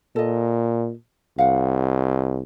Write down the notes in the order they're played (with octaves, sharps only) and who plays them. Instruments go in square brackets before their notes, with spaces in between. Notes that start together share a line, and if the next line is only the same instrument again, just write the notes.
[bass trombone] A#2 [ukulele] A4 D#5
[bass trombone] C2 [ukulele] F5 F#5